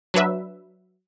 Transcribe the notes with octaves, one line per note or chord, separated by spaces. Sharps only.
F#3 D4 B4 E5